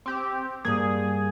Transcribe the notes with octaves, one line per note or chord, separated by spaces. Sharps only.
C4 G4
G2 A#3 G#4